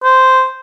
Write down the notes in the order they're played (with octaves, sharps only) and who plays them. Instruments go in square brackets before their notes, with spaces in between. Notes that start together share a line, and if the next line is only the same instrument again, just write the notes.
[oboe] C5